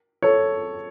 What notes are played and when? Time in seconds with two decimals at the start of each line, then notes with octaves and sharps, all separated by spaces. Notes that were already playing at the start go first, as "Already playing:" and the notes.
0.22 A4 C#5